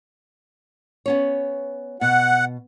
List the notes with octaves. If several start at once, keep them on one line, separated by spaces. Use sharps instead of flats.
B3 C#4 C#5
B2 F#5